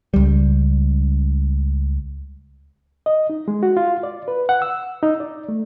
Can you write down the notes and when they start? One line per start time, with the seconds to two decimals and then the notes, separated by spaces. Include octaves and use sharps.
0.14 C#2 G3
3.06 D#5
3.30 D#4
3.48 G#3
3.63 F#4
3.77 F4
4.03 D5
4.28 B4
4.49 F#5
4.62 E6
5.03 D#4
5.20 D5
5.49 A3